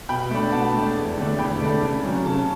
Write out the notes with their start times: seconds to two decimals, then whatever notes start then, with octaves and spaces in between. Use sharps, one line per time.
0.09 B2 G5 B5
0.31 A3 D4
0.52 B2 F#5 A5
0.74 A3 D4
0.96 E2
1.17 D3 A3 D4
1.39 E2 G5 B5
1.61 D3 A3 D4
1.82 C#3
2.04 F#3 C#4
2.26 C#3 A5 C#6